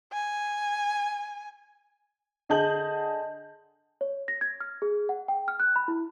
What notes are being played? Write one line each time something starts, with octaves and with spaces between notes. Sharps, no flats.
G#5
D3 G#4 D#5 A5 G6 F#7
C#5
A#6
G#6
F6
G#4
F#5
G5
F6
F#6
B5
E4